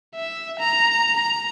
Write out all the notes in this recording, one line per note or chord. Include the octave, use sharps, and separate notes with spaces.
E5
A#5
A#5